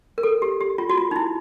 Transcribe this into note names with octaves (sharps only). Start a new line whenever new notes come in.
A#4
A4
G4
G4
F4
F#4
F4
D#4
E4